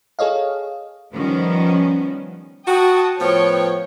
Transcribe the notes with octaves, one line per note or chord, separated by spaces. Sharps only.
G#4 A4 C#5 D#5 F5
D#3 F3 G3 B3 C#4
F#4 G5 A5 D#6
A2 F3 B3 C#5 G5 C#6